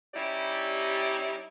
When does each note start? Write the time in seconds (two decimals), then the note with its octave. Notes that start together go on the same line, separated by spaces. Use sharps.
0.14 G3 C#4 D#4 E4 G4 D5